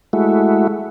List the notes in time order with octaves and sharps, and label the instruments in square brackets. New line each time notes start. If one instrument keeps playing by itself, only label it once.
[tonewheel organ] G#3 A3 E4 F#4